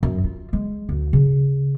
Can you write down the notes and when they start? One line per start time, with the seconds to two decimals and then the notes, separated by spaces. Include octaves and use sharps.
0.03 F#2
0.24 F4
0.53 G#3
0.89 D2
1.13 C#3